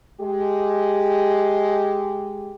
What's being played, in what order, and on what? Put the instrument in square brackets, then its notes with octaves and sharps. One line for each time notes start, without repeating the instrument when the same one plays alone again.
[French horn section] G#3 G4